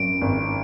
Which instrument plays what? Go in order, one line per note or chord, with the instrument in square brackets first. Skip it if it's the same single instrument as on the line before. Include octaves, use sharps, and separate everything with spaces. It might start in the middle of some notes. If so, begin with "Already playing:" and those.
Already playing: [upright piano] G#1 F#2 [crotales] D7
[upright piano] G#1